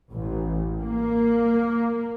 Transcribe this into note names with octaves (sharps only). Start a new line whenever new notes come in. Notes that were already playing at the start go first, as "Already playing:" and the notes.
A1
A#3